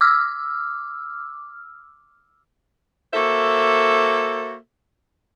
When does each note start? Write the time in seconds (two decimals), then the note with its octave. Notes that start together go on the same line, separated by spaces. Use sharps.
0.01 D6 E6 F6
3.14 A#3 F#4 A4 C5 E5